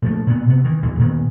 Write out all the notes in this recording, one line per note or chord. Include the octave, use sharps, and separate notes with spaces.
A#2 F3 A3
A#2 B3
C3 B3
D#3 E3
A#1 E2 A#2
A#2 D#3 A#3 B3